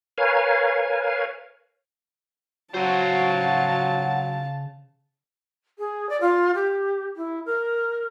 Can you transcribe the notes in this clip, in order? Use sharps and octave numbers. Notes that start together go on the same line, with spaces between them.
A#4 B4 C#5 F5 G#5
C#3 F#3 F#4 C5 F5 A5
G#4
D5
F4
G4
E4
A#4